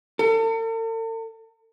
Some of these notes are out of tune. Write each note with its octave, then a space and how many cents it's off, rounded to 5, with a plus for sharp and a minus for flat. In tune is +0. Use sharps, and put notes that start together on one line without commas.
A4 +45